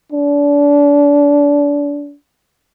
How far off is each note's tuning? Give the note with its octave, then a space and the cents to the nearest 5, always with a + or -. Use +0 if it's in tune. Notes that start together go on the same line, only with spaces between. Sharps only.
D4 -30